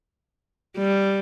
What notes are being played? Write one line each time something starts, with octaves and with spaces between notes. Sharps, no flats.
G3